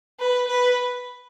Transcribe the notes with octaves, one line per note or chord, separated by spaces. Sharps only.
B4
B4